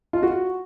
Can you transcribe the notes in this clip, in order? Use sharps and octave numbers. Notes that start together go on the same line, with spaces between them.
F4
F#4